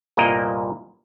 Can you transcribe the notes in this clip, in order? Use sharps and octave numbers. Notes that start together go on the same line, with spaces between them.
G1 C2 A#2 A#3 A#4 D#5